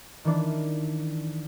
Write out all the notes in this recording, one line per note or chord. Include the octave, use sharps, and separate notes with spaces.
D#3 E3 D4